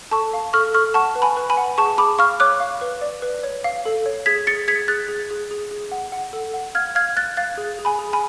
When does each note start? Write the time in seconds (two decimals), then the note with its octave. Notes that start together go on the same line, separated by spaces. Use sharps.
0.11 A4 A5 C#6
0.33 F5
0.53 A4 C#6 F6
0.74 A4 C#6 F6
0.94 F#5 A5 C#6
1.15 B4
1.22 G#5 B5
1.37 B4
1.50 G#5 B5
1.57 F#5
1.78 G#4 A5 C#6
1.98 G#4 B5 D6
2.19 F5 C#6 F6
2.40 C#5 D6 F#6
2.60 F5
2.81 B4
3.01 D5
3.22 B4
3.43 C#5
3.64 F5
3.85 A4
4.06 C#5
4.26 G#4 G#6 B6
4.47 G#4 A6 C#7
4.68 G#4 G#6 B6
4.88 G#4 F#6 A6
5.09 G#4
5.31 G#4
5.51 G#4
5.71 G#4
5.92 F#5
6.12 F#5
6.33 A4
6.54 F#5
6.75 F5 F6 G#6
6.95 F5 F6 G#6
7.17 F5 F#6 A6
7.37 F5 F#6 A6
7.58 G#4
7.79 G#4
7.85 G#5 B5
7.99 G#4
8.13 G#5 B5